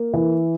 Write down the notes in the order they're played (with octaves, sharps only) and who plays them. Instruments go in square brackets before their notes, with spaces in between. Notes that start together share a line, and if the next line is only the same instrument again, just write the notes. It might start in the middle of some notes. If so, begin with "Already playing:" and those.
Already playing: [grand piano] A#3
E3